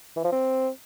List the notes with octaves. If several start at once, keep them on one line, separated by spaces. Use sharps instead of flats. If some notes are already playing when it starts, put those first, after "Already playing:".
E3
F3
C4